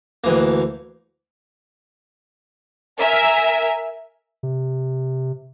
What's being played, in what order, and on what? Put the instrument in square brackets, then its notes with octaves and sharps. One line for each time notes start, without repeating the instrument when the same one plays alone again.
[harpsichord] D2 E3 A#3
[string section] A#4 E5 G#5
[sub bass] C3